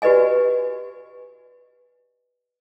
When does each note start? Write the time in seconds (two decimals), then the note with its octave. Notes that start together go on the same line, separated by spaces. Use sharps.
0.02 F#4 G4 B4 D5 D#5 G#5